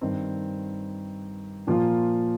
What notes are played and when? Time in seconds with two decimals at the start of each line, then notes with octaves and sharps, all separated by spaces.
0.01 G2 D#3 C4
1.67 A#2 F3 A#3 F4